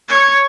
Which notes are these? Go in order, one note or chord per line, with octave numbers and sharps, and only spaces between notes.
C#5